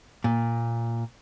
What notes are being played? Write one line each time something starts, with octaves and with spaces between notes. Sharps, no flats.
A#2